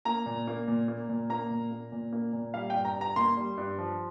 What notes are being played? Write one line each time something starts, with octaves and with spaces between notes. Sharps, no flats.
A#3 A#5
A#2
A#3
A#2
A#3
A#2
A#3 A#5
A#2
A#3
A#2
A#3
A#2
G3 F5
G2 G5
A#5
G2
A#5
A#3 C6
G3
G2
F3